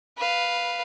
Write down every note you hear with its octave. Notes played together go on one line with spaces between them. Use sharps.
B4 F5